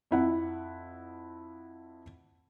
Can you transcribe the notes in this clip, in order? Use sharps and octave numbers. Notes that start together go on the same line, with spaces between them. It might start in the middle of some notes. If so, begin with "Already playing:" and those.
F2 E4 F#5